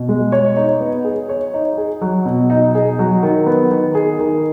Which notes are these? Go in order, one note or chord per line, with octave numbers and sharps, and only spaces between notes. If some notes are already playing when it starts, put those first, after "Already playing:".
Already playing: B2
G#3
C#5
D#4
B3
G#4
C#5
D#4
G#4
F#3
B2
D#4
G#4
F#3
D#3
B3
D#3
G#4
D#3